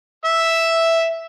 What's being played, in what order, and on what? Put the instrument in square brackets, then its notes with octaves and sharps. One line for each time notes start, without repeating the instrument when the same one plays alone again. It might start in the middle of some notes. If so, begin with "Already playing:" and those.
[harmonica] E5 E6